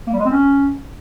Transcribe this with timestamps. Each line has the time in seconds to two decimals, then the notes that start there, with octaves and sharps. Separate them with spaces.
0.07 A#3
0.13 G3
0.19 G#3
0.25 C4
0.31 C#4